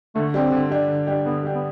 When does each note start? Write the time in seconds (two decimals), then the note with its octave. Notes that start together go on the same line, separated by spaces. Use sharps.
0.15 D3 A3
0.34 G3 C4 D4 G4
0.52 D3
0.70 G3 D4 G4
0.88 D3
1.07 G3 D4 G4
1.25 D3 B3
1.43 G3 D4 G4
1.55 B3